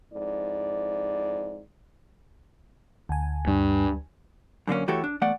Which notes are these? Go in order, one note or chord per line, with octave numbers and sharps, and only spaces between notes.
F2 G#2 E4 D5
D2 G#5
G2
F#2 D3 A#3 C#4
E3 A3 F#4 G4 A4 C#5
D4
E2 A3 D5 F#5